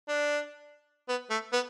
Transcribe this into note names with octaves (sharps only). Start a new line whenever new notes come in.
D4
B3
A3
B3